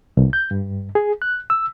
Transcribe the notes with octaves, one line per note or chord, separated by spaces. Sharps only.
C2
G6
G2
G#4
F#6
E6